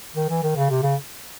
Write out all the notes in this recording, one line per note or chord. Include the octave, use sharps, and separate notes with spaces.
D#3
E3
D#3
C#3
C3
C#3